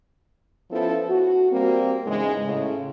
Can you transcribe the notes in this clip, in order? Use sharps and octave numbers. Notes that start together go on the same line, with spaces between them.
F3 B3 C#4 E4 A4
F#4
G3 A#3 C4
E2 G#2 C#3 G#3
A2 C#3